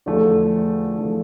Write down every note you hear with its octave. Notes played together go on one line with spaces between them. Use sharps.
E2 D3 F3 A3
E2 D3 F3 A3